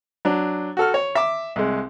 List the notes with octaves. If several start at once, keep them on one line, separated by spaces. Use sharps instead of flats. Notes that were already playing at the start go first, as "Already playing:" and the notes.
F#3 D4
F#4 A4 F6
C#5
E5 D6
C2 G#3